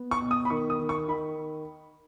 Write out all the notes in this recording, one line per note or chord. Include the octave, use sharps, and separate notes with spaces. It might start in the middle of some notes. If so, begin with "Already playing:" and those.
Already playing: B3
C#6
B2
D#6
B5
D#3 C#6
D#6
D#3
C#6
D#3 B5